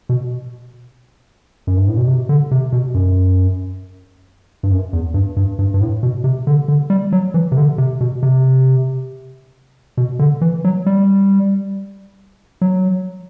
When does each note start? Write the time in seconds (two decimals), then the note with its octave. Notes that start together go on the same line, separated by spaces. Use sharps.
0.09 B2
1.67 F#2
1.77 G2
1.88 A2
1.97 B2
2.07 C3
2.29 D3
2.51 C3
2.72 B2
2.94 F#2
4.63 G2
4.70 F#2
4.93 E2
5.14 G2
5.36 G2
5.59 G2
5.74 G2
5.81 A2
6.03 B2
6.24 C3
6.47 D3
6.68 D3
6.90 G3
7.12 F#3
7.34 E3
7.52 C3
7.57 D3
7.78 C3
8.01 B2
8.23 C3
9.97 B2
10.19 D3
10.41 E3
10.64 F#3
10.86 G3
12.61 F#3